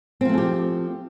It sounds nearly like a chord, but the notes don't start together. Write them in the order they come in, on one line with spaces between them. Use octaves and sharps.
C4 F3 A3 G#4 G4